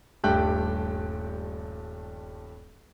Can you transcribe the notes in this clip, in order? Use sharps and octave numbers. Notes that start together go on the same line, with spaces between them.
D#1 G2 A3 G4 G5 F#6